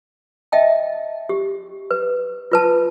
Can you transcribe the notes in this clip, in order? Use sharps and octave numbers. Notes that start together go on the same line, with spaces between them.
D#5 E5 G5 A5
G4
B4
F4 B4 A5